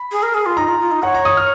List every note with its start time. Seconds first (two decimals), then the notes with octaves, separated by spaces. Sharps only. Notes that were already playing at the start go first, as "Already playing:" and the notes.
Already playing: B5
0.12 G#4
0.23 A#4
0.34 G#4
0.46 F4
0.57 D#4 A#5
0.68 F4
0.80 F4
0.91 D#4
1.03 C#5 F#5
1.15 A#5
1.25 D#6
1.37 F6